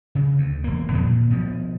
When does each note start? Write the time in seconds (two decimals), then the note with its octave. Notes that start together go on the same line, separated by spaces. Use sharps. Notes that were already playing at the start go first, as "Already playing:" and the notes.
0.15 C#3
0.38 D2
0.64 E1 A#3
0.92 F2 B2 D3 D#3
1.05 A#2
1.30 B2 F3